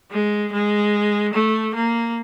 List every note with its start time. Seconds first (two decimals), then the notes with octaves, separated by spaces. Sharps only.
0.11 G#3
0.53 G#3
1.34 A3
1.75 A#3